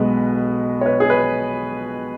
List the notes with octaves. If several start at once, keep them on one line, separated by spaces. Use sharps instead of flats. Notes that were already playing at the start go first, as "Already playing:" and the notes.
Already playing: B1 B2 G#3 B4
C#5
B4
G#4
B4